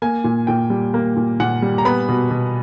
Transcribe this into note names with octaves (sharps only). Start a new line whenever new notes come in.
A#3 G#5
A#2
A#2 G5
G3
A#3
A#2
A#2 F#5
G3
A#5
B3 B5
B2
B2